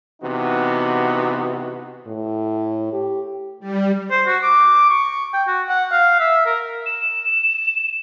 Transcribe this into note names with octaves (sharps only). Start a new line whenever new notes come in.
C3 E3 B3 D#4 F#4
A2
G4
G3
C5
F#4
D6
C#6
G5
F#4
F#5
F5
E5
A#4
E7